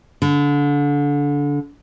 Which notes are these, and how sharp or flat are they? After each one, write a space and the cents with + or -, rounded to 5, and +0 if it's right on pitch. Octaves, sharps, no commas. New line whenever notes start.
D3 -25